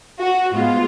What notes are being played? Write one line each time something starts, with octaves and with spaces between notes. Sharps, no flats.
F#4
G#2 G#3 B3 F4